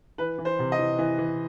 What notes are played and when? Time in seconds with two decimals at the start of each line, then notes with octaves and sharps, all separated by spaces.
0.18 E3 B4
0.38 E3
0.45 C5
0.59 C3
0.72 D#5
0.79 E3
0.99 E3
1.18 E3